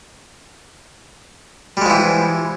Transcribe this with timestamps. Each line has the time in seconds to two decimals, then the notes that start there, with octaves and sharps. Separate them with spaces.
1.77 G3
1.81 G#3
1.86 F3
1.90 E3